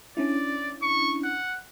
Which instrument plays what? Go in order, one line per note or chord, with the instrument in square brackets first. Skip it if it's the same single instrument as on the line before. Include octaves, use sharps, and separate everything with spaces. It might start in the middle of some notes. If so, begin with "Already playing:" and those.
[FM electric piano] C#4 D4 E4 [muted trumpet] D5
[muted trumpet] C#6
F#5